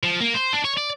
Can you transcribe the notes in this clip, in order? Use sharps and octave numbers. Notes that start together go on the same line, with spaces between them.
F3
A#3
C5
D4
C#5
D5